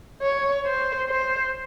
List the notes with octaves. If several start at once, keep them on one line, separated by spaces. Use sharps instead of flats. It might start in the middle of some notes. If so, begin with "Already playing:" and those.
C#5
C5
C5